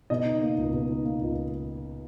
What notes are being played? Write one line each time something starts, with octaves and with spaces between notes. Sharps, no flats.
B2 D#5
D#4
A#3
C#2
B2
D#4
A#3
C#2